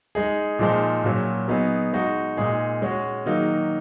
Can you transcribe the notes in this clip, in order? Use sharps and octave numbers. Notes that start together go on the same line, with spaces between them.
G#3 D#4 G#4
A#2 F3 G#3 D#4
A#2 F#3 C#4
F#3 B3 D#4 G#4
G#3 D#4 F#4
A#2 G#3 D#4 G#4
G#3 C#4 F#4
D#3 F#3 A#3 D#4